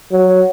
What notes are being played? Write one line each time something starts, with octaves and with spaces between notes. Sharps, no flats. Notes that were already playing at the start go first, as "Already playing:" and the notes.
F#3